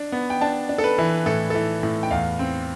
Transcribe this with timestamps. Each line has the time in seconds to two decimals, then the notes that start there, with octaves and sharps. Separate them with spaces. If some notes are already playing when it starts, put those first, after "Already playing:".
Already playing: D4
0.12 B3
0.30 G5
0.41 D4 A5
0.69 D4
0.78 A4
0.84 B4
0.98 E3
1.26 A2 A4
1.50 E3 A4
1.83 A2
2.03 G5
2.11 E2 F5
2.39 C4